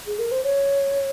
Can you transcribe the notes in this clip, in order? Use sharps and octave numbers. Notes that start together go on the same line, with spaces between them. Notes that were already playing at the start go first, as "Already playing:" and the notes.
G#4
A#4
C5
C#5